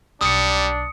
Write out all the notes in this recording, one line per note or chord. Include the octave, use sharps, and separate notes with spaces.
B1 G3 D4 D#6 C#7